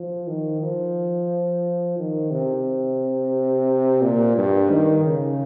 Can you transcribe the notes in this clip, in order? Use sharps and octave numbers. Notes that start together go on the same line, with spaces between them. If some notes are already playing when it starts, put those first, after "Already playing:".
Already playing: F3
D#3
F3
D#3
C3
A#2
G2
D#3
C#3